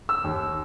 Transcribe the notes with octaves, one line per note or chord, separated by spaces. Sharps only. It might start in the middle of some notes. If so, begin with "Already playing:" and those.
E6
D#2